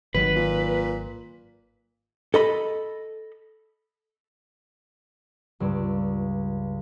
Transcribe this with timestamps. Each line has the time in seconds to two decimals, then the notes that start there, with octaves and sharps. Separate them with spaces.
0.14 G#1 D#3 F#3 B4
0.36 A#2
2.34 A4 D#5 B5
5.60 C#2 G2 D5